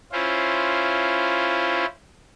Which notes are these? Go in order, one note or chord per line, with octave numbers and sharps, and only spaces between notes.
C#4 E4 F4 C5